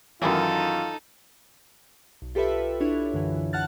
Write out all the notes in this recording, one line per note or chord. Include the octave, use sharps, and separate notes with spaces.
F#2 D#3 E3 D#4 F4 A4
B1
F4 G4 A4 B4 E5
D4 E4 C#5
F#2 D3 E3
F#5 A5 F6 F#6 A6